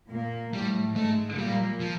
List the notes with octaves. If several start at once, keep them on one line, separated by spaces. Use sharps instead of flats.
A#2 A#3
A2 G3 A3
G#2 G#3 A3
A#2 G3 A#3
F3